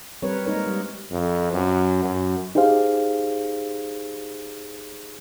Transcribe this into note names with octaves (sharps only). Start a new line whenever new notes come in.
G3 C4 A#4 B4 C#5
G#3 A#3 D#4 A#4 C#5
G3
F2
F#2
F#2
D#4 G4 G#4 C5 F5